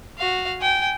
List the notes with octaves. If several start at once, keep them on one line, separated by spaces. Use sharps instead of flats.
F#4 F5
G5 G#5